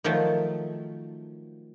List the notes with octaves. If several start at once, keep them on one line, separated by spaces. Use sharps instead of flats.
D#3 F3 F#3 A3